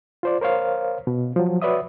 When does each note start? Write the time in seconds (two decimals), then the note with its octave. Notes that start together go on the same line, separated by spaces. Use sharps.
0.23 F4 C5 D5
0.41 A#4 C5 C#5 F5
1.07 B2
1.36 F3 F#3
1.62 F#4 B4 C#5 D5 E5 D#6